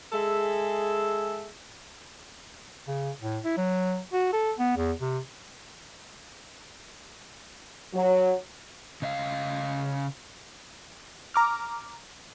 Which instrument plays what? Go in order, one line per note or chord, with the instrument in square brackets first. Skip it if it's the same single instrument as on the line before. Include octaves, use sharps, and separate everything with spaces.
[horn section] G#3 G#4 A4 E5
[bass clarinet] C#3
A2
E4
F#3
F#4
A4
B3
E2
C3
[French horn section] F#3
[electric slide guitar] C#3 D#5 F5
[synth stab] A#5 D6 F6